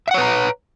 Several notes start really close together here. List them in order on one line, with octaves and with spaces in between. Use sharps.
E5 F#5 C#5 B4 A#5